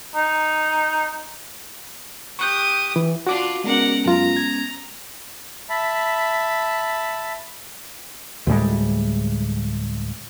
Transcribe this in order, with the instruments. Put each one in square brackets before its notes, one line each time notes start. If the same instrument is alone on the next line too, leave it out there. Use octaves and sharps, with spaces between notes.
[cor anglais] D#4
[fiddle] G4 D#6 [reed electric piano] C#6 F#6 G6
[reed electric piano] E3
[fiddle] D4 F4 [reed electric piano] F#4 D6
[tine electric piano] G#3 B3 C#4 [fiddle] A#4 F#5
[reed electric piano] F#2 F4 [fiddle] A#5
[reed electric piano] G#6
[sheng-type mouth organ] E5 A5 B5
[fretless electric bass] D2 A2 G3 G#3